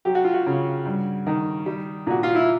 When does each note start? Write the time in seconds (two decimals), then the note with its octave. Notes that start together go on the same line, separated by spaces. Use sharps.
0.05 F#3 G4
0.15 F#4
0.24 F4
0.34 F#4
0.46 C#3
0.85 G2
1.26 D#3
1.66 G3
2.07 A#2 F#4
2.23 F4
2.35 E4